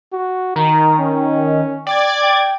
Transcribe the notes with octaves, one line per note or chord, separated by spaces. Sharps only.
F#4
D#3 A#5
C#4
D5 G5 D6 G#6
G5